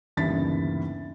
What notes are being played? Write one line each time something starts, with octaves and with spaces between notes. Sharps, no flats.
G1 D#2 C#3 E3 A6 B6